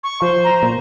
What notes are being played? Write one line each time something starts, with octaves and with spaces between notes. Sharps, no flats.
C#6
F3 C5
A#5
A#2